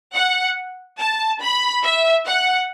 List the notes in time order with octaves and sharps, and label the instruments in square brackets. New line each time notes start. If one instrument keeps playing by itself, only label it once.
[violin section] F#5
A5
B5
E5
F#5